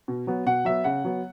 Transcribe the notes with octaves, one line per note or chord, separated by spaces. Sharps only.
B2
F#3 B3
B2 F#5
F#3 B3 E5
C#3 F#5
F#3 B3